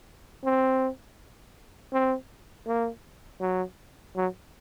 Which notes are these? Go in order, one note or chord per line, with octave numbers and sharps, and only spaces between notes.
C4
C4
A#3
F#3
F#3